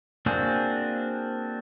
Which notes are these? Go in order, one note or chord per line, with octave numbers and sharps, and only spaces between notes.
A#3 C4 D4 F#4 G#4